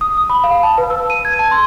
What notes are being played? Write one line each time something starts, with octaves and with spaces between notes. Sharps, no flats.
D#6
D#6
B5
F5
A5
B4
E6
D#7
G#6
A5
C6